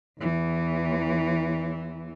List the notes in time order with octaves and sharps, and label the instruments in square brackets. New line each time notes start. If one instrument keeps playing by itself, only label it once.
[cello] E2 E3